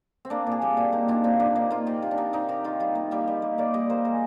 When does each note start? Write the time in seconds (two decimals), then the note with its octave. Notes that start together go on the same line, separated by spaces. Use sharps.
0.25 C4
0.30 A#3 D4
0.47 A#2
0.52 G#4
0.62 G3 G4
0.77 A#2 F4
0.92 A#3 D#4
1.08 A#2 D4
1.24 A#2 C4
1.40 A#3 D4
1.55 A#3 D#4
1.71 A#3 F4
1.87 C3 G4
2.02 C3 F4
2.11 D4
2.18 C3 D#4
2.33 C3 D#4
2.49 C3 G4
2.64 D#3 F4
2.80 G3 F4
2.95 A#3
3.11 G3 G4
3.27 G3
3.42 A#3
3.58 A#3 D5
3.74 G3 D#5
3.90 A#3 C5
4.05 G#3 A#4